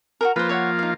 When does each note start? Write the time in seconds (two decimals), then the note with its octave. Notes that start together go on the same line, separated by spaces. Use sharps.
0.21 F#4 G#4 A#4
0.36 F3 A#3 F4 B4 C5
0.49 C#5 E5 F#5
0.79 D#4 F5